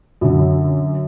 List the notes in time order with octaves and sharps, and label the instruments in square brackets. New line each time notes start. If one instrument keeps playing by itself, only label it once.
[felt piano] F#2 D3